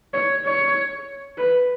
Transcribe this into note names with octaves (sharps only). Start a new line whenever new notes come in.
C#5
C#5
B4